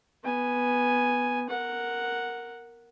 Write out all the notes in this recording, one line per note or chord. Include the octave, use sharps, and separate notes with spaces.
B3 G#5
A#4 F#5